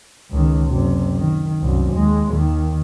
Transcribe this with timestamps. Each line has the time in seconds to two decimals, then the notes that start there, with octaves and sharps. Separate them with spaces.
0.31 C#2 D#3
0.68 F#1 C3
1.14 D#3
1.61 C2 F#2
1.92 D#2 G#3
2.31 D#2 D#3